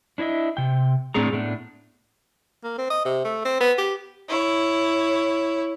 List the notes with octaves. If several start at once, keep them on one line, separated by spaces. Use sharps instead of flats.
D4 E4 C#5 D#5 E5
C3 G5
A2 C4 D4 G#4 A#5
A2 A3 B3 D4
A#3
C4
D#5
C3
A3
C4
B3
G4
E4 C#5